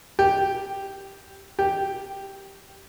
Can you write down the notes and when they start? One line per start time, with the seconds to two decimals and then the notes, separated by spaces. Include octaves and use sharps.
0.19 G4
1.59 G4